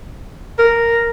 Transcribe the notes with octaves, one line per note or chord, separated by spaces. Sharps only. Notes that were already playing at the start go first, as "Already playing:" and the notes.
A#4